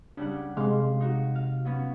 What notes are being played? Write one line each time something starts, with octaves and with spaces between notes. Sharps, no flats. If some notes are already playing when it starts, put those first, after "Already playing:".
C#3 G3 D4 F#5
C3 G#3 F5 C6
D#4 F#4
F5
F#3 B3 C#4